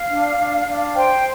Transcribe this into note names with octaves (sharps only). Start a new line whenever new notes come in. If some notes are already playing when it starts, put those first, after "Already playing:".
Already playing: F5
D4
D4
D4
C5 G5